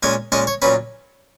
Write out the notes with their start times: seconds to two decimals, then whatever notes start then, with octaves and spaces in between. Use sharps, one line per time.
0.03 A#2 G#3 C#4 G#5
0.32 A#2 G#3 C#4 D#5
0.47 C#5
0.62 A#2 F#3 C#4 B4